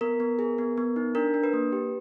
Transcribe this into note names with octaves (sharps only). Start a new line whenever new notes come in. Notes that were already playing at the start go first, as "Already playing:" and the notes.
B3 A#4
B3
G#4
B3
B3
D#4
D4 A#4
D4
B4
A#3
G4